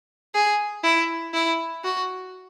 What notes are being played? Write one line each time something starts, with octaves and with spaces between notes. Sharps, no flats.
G#4
E4
E4
F#4